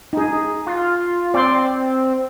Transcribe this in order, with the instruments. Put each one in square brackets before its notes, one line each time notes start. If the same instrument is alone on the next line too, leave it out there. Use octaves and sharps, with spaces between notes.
[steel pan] D#4 G#4
[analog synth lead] F4
[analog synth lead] C4 [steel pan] D5 C6